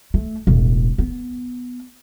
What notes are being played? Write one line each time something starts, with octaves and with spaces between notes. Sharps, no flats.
A3
E1 A1
B3